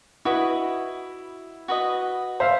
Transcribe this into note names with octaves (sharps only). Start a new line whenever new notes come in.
E4 F#4 B4 D#5
F#4 B4 D#5
C5 E5 F5